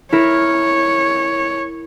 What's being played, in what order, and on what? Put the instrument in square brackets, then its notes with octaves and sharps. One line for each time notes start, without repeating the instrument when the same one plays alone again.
[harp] E4 A#4 [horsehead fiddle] C#5